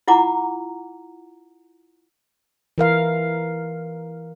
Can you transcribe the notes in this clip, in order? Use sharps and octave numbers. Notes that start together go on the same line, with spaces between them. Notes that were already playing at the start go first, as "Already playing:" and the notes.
E4 F4 F#5 A#5 D6
E3 A#4 F5